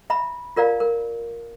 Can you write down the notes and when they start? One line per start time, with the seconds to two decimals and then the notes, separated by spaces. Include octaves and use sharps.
0.10 E5 A#5 B5
0.56 F4 A#4 D5 F5 A#5
0.80 A#4